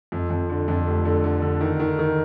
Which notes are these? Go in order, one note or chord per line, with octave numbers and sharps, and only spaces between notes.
F2
F2
D3
F2
F1
D3
D3
D3
D#3
D#3
D#3